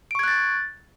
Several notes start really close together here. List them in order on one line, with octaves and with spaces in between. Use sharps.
D7 C#6 G#6 F#6 A6